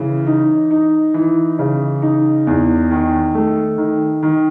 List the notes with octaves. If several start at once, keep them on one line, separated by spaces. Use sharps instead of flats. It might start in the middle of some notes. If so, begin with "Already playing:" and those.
Already playing: C#3 E3
D#4
D#4
E3
C#3
D#4
E2
D#3
A3
D#3
D#3